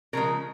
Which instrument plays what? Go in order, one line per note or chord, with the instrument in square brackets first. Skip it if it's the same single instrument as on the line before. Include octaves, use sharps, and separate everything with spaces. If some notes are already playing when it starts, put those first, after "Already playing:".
[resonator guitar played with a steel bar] C#3 F3 G#3 A#4